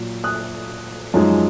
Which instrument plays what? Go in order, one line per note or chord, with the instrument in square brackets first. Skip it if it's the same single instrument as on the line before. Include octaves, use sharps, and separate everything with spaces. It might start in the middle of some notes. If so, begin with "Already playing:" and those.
Already playing: [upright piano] A#2 F#3
D#6 F#6
F#2 F3 G#3 D#4